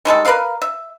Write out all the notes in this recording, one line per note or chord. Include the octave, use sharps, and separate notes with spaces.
D#3 G3 G#3 A4
A#4 B4 D5 F5
E5